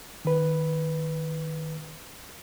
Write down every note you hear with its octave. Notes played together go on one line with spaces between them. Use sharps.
D#3 B4